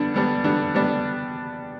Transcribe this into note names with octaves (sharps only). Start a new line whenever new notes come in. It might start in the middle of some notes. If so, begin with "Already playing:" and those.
Already playing: D3 G3 B3 D4
D3 G3 B3 D4
D3 G3 B3 D4
D3 G3 B3 D4